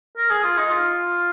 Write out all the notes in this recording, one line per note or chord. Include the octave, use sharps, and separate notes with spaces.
A#4
G#4
F4
D#4
F4